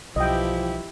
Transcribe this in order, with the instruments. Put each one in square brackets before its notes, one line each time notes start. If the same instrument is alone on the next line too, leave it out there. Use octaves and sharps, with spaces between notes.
[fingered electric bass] B1 [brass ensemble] G2 E3 F3 [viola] E4 G4 [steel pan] D#5 G5